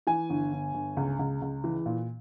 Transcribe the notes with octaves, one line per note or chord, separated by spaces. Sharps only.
E3 G#5
G1
G1
G1
C#2
C#2
C#2
E3
A#2